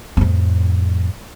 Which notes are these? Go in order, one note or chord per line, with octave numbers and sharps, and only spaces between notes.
F2 A2